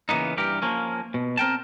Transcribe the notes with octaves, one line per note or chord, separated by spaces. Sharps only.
C#3 E3 A#3 B3 D#4
G2 E3 G4 A#4
F3 A#3 C#4
B2
C4 A#4 G5 A5